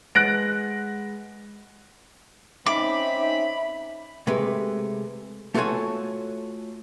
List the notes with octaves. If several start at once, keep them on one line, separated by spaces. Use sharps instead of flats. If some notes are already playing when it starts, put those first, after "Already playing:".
G#3 B4 F#5 F#6 A#6 D7
C4 C#4 D#4 E5 B5 D6
C3 G#3 A3 B4
A3 F4 F#4 A4 C#5 G#5